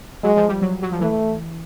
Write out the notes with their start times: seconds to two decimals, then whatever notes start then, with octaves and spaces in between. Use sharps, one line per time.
0.23 F#3 G#3
0.37 F3
0.49 G3
0.62 F#3
0.82 F#3
0.92 F3
1.00 E3 A3